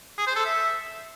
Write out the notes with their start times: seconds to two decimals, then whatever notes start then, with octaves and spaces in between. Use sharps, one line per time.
0.18 G#4
0.27 C5
0.36 A4
0.45 E5